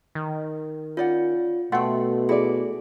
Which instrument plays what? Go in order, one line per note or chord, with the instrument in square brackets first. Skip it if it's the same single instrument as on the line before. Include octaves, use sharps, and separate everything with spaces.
[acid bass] D#3
[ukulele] C#4 D5 F#5 [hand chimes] F4
[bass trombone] B2 [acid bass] A3 [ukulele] F#5 G5 [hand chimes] C6
[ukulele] E4 D5 [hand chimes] G#4